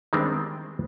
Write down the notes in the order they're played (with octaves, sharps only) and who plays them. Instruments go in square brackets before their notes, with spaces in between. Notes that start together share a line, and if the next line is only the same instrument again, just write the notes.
[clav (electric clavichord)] D#3 G3 G#3 B3 C4 D4